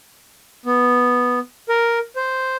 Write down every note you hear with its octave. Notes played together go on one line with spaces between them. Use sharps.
B3
A#4
C5